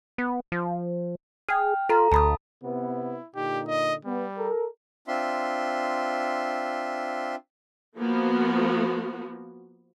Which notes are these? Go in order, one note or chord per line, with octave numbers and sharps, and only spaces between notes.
B3
F3
G#4 G5 F6
F4 A4 A#5
D2 A5 B5 D#6
C3 B3 E4
A#2 D3 D#4 G4
D#5
G3 B3
A4 A#4
C4 D4 F4 E5 C6
F3 A#3 B3 F#4